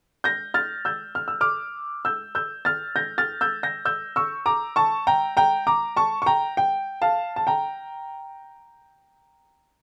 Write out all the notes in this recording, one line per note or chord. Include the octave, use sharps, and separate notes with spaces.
G6 A#6
F6 A6
E6 G6
F6
E6
D6 F6
E6 G6
E6 G6
F6 A6
G6 A#6
F6 A6
E6 G6
G6 A#6
E6 G6
C#6 E6
A#5 D6
A5 C#6
G5 A#5
G5 A#5
A#5 D6
A5 C#6
C#6
G5 A#5
G5
F5 A5
A5
G5 A#5